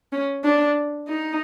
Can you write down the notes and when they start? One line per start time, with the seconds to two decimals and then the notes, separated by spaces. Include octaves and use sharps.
0.13 C#4
0.44 D4
1.08 D#4